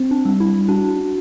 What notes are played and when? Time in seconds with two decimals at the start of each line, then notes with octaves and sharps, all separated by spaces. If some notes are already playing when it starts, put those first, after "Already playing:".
Already playing: C4
0.11 D4
0.25 G3
0.40 E4
0.68 D4 F#4